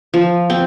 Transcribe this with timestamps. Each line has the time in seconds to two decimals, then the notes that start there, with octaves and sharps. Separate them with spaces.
0.14 F3
0.50 C4